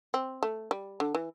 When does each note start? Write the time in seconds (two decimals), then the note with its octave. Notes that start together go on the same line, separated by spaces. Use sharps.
0.14 C4
0.43 A3
0.71 G3
1.00 D3
1.15 E3